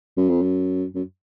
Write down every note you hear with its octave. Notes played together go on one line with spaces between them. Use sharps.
F#2
F2
F#2
F#2